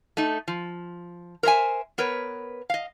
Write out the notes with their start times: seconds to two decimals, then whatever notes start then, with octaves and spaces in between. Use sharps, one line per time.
0.17 A3 D#4
0.48 F3
1.43 A#4 C5 C#5 E5 G#5
1.98 B3 A#4 B4 C#5
2.70 D#5 F5